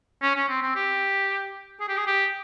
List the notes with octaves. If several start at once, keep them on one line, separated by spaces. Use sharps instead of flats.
C#4
C#4
C4
C4
G4
G#4
G4
G#4
G4